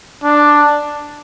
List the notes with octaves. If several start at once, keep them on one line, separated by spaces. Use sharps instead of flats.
D4